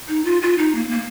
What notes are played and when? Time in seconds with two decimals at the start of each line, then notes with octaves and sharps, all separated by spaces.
0.08 D#4
0.25 F4
0.42 F4
0.58 D#4
0.75 A#3
0.91 A#3